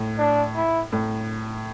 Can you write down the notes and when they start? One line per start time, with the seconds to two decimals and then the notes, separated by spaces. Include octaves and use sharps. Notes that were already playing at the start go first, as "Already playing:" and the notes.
Already playing: A2
0.18 D4
0.56 E4
0.92 A2